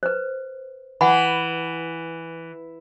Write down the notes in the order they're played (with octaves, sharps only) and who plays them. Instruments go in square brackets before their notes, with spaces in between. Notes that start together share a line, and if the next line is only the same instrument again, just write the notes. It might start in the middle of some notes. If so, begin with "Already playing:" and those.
[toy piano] B4 C5
[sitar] E3 [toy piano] F#5 B5